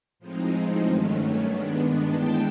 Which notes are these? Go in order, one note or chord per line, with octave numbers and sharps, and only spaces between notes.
A2 F3 G#3 C4 D#4
G2 D#3 F#3 A3 C#4
G2 D#3 G#3 B3 D4
A2 E3 G#3 B3 G5 A5